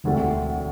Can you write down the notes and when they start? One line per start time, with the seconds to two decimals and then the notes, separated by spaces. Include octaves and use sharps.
0.04 E1 D2 D3 A3 C4